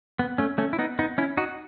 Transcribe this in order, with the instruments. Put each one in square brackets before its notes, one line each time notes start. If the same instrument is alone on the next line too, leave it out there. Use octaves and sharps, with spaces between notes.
[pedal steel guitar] B3
A3 C#4
A3 C#4
E4
B3 D#4
B3 D#4
C#4 E4
D#4 F#4